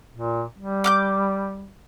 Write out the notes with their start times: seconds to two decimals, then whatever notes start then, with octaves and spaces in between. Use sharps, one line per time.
0.15 A#2
0.58 G3
0.84 D6 F6 G6